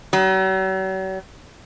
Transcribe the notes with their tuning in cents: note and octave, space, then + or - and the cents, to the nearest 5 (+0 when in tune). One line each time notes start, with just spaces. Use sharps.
F#3 +45